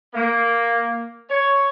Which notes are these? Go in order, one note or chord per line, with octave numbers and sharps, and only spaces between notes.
A#3
C#5